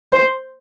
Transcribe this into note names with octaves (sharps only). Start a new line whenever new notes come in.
C5